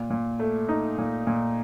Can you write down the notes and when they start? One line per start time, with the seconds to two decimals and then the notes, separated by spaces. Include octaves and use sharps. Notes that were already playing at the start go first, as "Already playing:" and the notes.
Already playing: A#2
0.10 A#2
0.39 A3
0.69 D#4
0.98 A#2
1.27 A#2